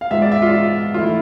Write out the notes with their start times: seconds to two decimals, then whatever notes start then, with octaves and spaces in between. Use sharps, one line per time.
0.01 F5
0.11 G#2 G#3 B3 F4 E5
0.22 D5
0.32 E5
0.42 F4
0.94 E3 A3 E4 F4